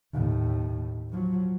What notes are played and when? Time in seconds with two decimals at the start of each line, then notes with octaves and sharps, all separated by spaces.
0.13 D#2 A2
1.10 F3 F#3